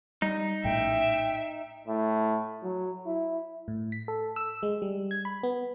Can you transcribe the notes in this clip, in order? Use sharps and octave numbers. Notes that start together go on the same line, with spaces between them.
G3 D#4
A#1 A2 E5 G5
A2
F#3
E4
A2
B6
A4
E6
G#3
G3
G#6
B5
B3